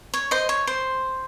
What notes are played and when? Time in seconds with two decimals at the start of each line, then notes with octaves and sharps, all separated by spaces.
0.14 C#5
0.31 C5 D#5
0.49 C#5
0.67 C5